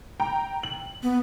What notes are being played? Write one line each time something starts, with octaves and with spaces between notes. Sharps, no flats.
G5 A#5
F#7
B3